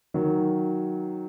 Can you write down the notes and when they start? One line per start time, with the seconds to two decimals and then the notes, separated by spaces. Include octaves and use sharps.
0.14 D#3 F#3